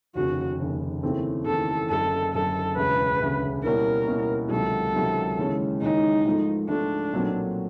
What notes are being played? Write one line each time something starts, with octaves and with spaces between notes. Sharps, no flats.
F1 D#2 C#3 F#4
F1 D#2 C#3
D#2 C#3 E3 A3 C4
D#2 C#3 E3 A3 C4 A4
F#1 F#2 D3 A4
F#1 F#2 D3 A4
E1 D2 C#3 B4
E1 D2 C#3
B2 G3 A#3 C#4 E4 A#4
B2 G3 A#3 C#4 E4
C#2 C3 D#3 F#3 A4
C#2 C3 D#3 F#3
D#2 C#3 E3 G#3 C#4
D#2 C#3 E3 G#3 C#4 D#4
G#2 F3 A3
G#2 F3 A3 D4
B1 A#2 F#3 A3 C4